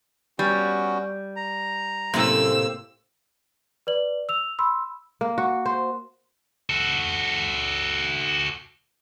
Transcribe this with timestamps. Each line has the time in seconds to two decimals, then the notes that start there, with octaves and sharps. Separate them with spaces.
0.39 G3 B3 C#4 F#4
1.36 A#5
2.14 F#2 A2 C3 A#3 C4 E6
3.87 B4 D5 F#7
4.29 E6 F7
4.59 B5 C6 E6
5.21 A#3
5.38 F#4
5.66 C5
6.70 F#4 A4